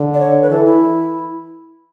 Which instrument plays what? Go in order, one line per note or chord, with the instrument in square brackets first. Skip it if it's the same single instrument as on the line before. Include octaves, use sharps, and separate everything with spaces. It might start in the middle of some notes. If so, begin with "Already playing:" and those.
Already playing: [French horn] D3
[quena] D5
C#5
B4
[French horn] E3 [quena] A4
[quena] E4